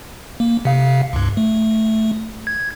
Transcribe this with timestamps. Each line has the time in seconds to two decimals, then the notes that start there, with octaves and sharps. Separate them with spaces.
0.40 A#3
0.65 C3 F5
1.13 C#2 G2
1.37 A3
2.47 G#6